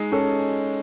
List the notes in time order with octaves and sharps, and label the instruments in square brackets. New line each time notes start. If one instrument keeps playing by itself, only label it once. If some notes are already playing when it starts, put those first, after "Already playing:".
Already playing: [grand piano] G#3 D#4
[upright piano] C#4 [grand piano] A4